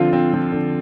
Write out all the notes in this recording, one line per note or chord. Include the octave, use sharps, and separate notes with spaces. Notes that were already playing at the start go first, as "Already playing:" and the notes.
Already playing: D3 F3 C4 F4
C4
F3
D3